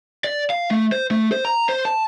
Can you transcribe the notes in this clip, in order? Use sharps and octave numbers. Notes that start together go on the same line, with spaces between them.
D5
F5
A3
C5
A3
C5
A#5
C5
A5